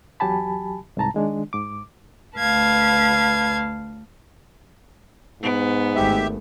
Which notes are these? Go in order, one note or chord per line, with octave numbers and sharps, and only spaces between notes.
E2 F#3 G4 G#5 A5 B5
C2 G#2 A5 A#5
D#3 G#3 D4
G#2 D6
D2 B4 F5 A5 G#6
G#2 B3
G#1 A3 G4 E5